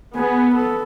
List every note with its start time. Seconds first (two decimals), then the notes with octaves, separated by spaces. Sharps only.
0.15 B3 G#4
0.55 A4